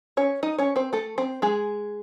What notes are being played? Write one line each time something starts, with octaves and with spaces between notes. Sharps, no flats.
C#4 C#5
D#4 D#5
C#4 C#5
C4 C5
A3 A4
C4 C5
G#3 G#4